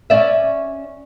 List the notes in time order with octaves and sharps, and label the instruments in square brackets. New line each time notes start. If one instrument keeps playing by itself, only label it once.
[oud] C#4 D5 E5